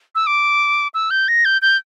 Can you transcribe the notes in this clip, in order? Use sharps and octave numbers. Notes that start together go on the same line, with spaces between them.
E6
D6
E6
G6
A#6
G6
G6